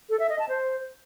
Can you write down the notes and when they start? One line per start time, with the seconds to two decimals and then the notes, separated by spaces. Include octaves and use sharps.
0.10 A4
0.20 E5
0.29 D#5
0.39 A5
0.49 C5